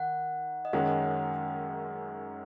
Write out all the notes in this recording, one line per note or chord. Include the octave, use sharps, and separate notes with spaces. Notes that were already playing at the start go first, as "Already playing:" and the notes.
Already playing: D#3 F#5
D#5
F#2 D#3 G#3 C#4 F#5